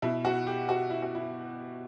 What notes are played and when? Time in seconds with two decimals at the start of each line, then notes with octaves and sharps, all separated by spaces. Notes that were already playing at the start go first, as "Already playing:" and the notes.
0.02 B2 E4
0.25 F#4
0.47 G4
0.69 F#4
0.90 E4
1.02 F#4
1.15 E4